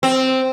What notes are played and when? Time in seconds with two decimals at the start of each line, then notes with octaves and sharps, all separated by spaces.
0.03 C4